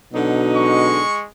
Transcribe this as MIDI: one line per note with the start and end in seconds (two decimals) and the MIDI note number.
0.13 1.04 47
0.13 1.00 50
0.13 1.00 54
0.13 1.00 63
0.57 1.24 56
0.57 1.24 85